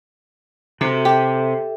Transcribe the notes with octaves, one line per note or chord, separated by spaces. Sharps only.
C3 F#4 A4 E5
G4 A4 E5